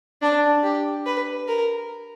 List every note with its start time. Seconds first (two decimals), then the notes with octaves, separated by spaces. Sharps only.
0.22 D4
0.63 G4
1.06 B4
1.48 A#4